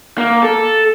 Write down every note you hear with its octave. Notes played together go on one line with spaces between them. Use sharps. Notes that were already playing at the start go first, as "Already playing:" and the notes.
A#3
A4